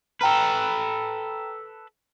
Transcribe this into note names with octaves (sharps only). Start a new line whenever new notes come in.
A4 B4 G5 A#5 F6